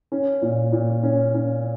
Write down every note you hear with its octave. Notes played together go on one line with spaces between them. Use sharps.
C#4
A#2
A#2
C#4
C#4